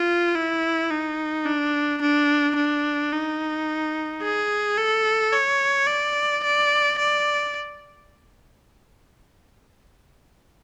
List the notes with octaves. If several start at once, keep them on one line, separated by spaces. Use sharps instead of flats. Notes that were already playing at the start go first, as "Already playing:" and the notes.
Already playing: F4
E4
D#4
D4
D4
D4
D#4
G#4
A4
C#5
D5
D5
D5